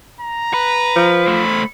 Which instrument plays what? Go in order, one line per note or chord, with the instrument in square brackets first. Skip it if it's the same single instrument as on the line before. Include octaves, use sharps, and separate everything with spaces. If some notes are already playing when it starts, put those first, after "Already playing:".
[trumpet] A#5
[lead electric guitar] B4
[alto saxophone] F3
[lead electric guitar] A3 C5 [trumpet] B5